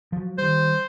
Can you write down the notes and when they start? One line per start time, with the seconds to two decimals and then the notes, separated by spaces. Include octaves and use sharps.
0.12 F3 F#3
0.38 D#3 G3 C5